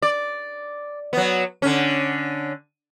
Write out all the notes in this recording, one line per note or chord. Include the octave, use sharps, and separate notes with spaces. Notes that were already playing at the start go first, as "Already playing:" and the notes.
D5
F#3 B3
D3 C#4